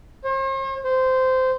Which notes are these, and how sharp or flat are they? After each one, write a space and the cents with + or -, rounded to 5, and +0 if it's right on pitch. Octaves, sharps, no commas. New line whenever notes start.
C5 +45
C5 -15